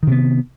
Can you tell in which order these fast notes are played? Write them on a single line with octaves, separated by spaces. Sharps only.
D#3 C3 B3